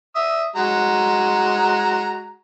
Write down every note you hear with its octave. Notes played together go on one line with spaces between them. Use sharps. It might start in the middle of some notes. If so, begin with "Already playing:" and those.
E5 D#6
G#3 F#4 A#5